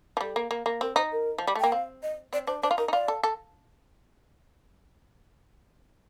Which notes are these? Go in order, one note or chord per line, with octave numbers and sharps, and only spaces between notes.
F3
G3 A4
A#3
A#3
A#3
C4 A#4
D#4 C5
A#4
F3
G3
A3
A#3 G5
C4 F5
D#5
C4 D5
D4 C5
D4 C5
F4
D#4 A#4
D#4
F4 D5
A4
A4